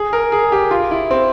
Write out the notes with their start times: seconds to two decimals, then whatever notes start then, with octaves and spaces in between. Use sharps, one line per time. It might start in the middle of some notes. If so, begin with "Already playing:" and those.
Already playing: G#4
0.13 A#4
0.32 G#4
0.52 G4
0.71 F4
0.91 E4
1.11 C4